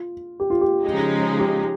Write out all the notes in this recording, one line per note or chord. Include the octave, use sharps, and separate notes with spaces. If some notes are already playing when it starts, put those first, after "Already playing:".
Already playing: F4
G4
F4
G4
C#3 F3 G#3 D#4
G4